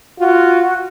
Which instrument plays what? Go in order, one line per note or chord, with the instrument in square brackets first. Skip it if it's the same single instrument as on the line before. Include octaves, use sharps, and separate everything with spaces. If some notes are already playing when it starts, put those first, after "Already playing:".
[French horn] F4 [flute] F#4